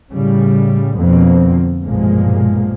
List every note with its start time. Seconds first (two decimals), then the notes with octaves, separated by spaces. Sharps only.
0.11 A2 C#3 G3
0.98 F2 B2 D3 F3 A#3 C4
1.85 B1 G2 A#2 F3 G#3 A#3